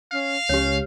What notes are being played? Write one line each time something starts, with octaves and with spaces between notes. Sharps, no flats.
C#4 F5
C#2 C#4 G4 C#5